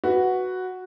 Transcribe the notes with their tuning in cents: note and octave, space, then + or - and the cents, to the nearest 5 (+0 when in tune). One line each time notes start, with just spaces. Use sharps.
F#4 +0 B4 +0